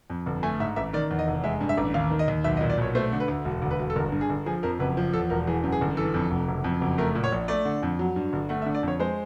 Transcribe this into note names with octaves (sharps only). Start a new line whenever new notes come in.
F2
G1
A3 G#5
G#2 E5
A1 E5
D#3 D5
E2
D#5
F1
G#3 E5
G2
E5
A1
D#2 F5
D#3
D#5
D#2
B1 E5
D#5
A#2
D5
B1 C#5
A3 C5
D3
B4
D2
E1
D2
B4
E1
A4
G1 A#4
G2
G#4
G1
F3 G#4
F2 A#4
F#1 B4
F3
E2 A4
E1 A#4
E3 G#4
F#2
G#4
G1
E3 A4
F2
F1
F#1
F2
F#1
A3 A#4
A#2
C#5
A#1
A3 D5
D3
F2
F#3
G2
G1
A3 F#5
E5
D3
D5
F2 C#5
G#3 C5